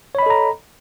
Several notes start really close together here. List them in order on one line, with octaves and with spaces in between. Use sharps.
C#5 B5 D#5 A4 A#5